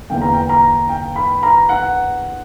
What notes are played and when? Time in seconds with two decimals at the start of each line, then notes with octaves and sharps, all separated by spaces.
0.10 E2 D3 A#3 G5
0.21 A#5
0.34 G5
0.49 A#5
0.89 G5
1.16 B5
1.43 A#5
1.69 F#5